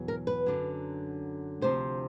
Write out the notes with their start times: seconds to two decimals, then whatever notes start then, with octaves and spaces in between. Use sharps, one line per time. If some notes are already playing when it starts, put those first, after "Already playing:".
Already playing: E2 B2 F#3
0.08 A#4
0.27 B4
0.46 F#2 D3 F#3
1.62 D2 C3 F3 C5